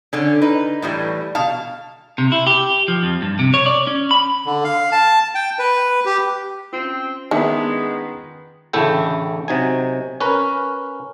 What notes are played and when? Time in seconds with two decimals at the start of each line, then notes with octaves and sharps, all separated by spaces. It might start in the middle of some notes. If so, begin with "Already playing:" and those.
0.13 D3 C#4
0.42 D#4 B4
0.82 A2 E3 G3
1.35 B2 F5 A5
2.18 C3
2.32 E4
2.47 G4
2.88 F3
3.03 F2
3.22 G2
3.39 C3
3.54 C#5
3.66 D5
3.87 C#4
4.11 B5
4.46 D3
4.65 F5
4.92 A5
5.35 G5
5.59 B4
6.06 G4
6.73 C4 C#4 F4
7.31 D#3 G#3 B3 D4 E4
8.73 A1 D2 C#3 A3 E4 G5
9.48 C3 F#3 D#4 G#5
10.21 C#4 A#4 B4